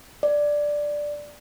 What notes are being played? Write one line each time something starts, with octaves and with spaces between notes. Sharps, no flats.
D5